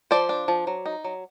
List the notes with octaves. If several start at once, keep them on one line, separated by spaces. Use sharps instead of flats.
F3 C5 D5
D4
F3
F#3
D#4
F#3